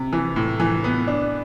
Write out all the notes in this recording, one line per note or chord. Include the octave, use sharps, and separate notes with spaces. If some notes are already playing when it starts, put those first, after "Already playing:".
Already playing: C3
E3
A2
E3
B3
D4